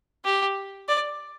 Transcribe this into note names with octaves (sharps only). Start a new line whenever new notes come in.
G4
D5